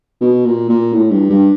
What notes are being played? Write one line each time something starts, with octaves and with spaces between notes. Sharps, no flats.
B2
A#2
A#2
A2
G2
G2